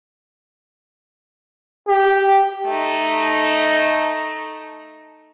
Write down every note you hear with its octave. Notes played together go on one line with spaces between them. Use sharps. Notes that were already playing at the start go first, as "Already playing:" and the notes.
G4
A3 D#4